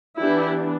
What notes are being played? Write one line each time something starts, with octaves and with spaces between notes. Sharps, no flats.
E3 B3 D4 E4 G4